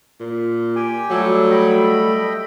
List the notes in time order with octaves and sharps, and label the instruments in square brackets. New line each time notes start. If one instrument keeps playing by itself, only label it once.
[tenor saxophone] A#2
[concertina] G4 G5 G#5
[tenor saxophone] F#3 [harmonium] G3 A3 A4
[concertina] D#5 G5 B5